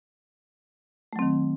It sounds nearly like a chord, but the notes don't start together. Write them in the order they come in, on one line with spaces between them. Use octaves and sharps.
A3 F#3 C4 D#3